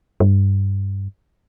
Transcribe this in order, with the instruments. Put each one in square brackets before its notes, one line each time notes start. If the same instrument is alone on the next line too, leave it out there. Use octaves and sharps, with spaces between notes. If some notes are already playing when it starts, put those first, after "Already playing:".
[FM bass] G2